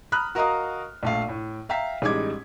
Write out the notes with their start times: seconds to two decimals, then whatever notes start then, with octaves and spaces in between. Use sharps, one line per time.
0.12 A#5 B5 D#6 F6 F#6
0.35 F#4 A#4 D#5 F5 A#5 D#6
1.03 A#1 A3 F5
1.28 A2
1.69 E5 F5 G5 A#5 B6
2.02 A1 G3 G#3 D#4 D6 G#6